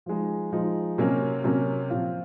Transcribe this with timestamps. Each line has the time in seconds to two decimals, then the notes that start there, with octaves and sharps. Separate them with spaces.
0.06 F3 G#3 D#4
0.52 F3 G#3 D#4
0.98 C3 F#3 A#3 C#4
1.44 C3 F#3 A#3 C#4
1.90 C3 F3 C4 F4